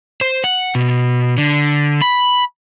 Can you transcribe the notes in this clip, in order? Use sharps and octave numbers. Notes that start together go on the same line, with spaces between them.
C5
F#5
B2
D3
B5